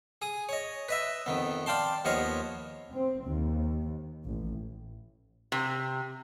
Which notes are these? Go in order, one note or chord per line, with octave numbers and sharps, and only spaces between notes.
G#4 D#6
C#5 D#5
B4 D#5 E5
F2 D#3 B3
D5 F5 G5 A5 C6
D#2 F3 B3 C#5 D#5 F5
C4
D#2
A1
C3